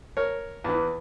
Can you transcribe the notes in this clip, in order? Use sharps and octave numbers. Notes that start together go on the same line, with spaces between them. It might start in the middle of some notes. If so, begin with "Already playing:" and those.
A#4 C#5
E2 E3